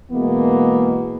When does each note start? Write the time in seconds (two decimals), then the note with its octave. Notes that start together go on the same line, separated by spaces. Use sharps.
0.11 B2 E3 G#3 A#3 B3